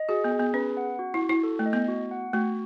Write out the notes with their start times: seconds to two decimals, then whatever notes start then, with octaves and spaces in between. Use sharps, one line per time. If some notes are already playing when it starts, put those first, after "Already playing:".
Already playing: D#5
0.09 F#4 G#4
0.24 B3
0.32 G#4
0.39 B3
0.54 C#4 B4
0.77 F#5
0.99 F#4
1.14 E4
1.21 F#4
1.29 E4
1.43 A4
1.59 A3
1.66 D#5
1.73 B3
1.88 F#4
2.11 F#5
2.33 A3 F#4